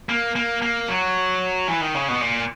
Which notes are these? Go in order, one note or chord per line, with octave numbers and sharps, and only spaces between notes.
A#3
A#3
A#3
F#3
E3
D#3
C#3
B2
A#2